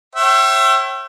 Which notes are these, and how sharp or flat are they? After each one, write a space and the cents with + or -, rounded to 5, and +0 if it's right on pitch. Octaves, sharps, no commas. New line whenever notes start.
C#5 -45 E5 +25 G5 -30